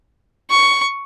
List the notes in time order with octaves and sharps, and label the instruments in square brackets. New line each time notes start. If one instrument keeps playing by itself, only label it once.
[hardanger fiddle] C#6